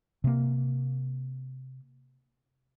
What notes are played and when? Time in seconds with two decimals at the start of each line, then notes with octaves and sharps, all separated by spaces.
0.24 C3 A#3